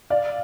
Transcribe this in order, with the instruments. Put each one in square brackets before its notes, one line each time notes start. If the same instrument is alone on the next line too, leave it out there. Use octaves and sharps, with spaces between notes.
[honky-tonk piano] D5 F5